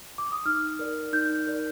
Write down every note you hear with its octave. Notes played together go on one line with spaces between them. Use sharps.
D6
D#6
D#4 F6
A#4 D5
D#4 G6
A#4 D5